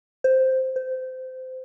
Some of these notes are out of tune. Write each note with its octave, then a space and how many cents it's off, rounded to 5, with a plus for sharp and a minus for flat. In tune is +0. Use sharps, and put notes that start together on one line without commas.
C5 +0
C5 -20